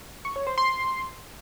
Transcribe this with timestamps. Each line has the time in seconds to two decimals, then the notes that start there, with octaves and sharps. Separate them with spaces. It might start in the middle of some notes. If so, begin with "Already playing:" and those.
0.25 C#6
0.36 C#5
0.47 C5
0.58 C6